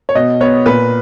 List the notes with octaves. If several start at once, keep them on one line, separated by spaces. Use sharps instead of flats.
C#5
B2 D#5
B3 C#5
A#2 B4